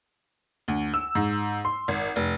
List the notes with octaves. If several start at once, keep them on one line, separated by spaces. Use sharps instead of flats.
D2
E6
G#2
C6
G#1
F1